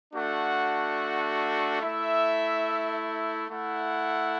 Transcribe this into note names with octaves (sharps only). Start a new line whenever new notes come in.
A3 D4 F#4 F#5
A3 E4 E5
A3 E4 F#5